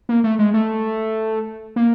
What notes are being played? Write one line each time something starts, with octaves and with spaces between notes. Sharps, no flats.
A#3
A3
G#3
A3
A#3